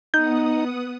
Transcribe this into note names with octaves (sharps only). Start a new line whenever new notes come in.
B3 D#4 F#5 D#6 G6